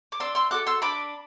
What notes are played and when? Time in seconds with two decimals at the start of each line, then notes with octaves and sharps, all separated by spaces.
0.12 D6
0.20 D4 C6 E6
0.35 C6 E6
0.51 F#4 A4 D6 F#6
0.67 C6 E6
0.82 D4 B5 D6